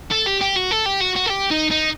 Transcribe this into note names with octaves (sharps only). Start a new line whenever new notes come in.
A4
G4
G4
F#4
A4
G4
F#4
F#4
A4
G4
D#4
D#4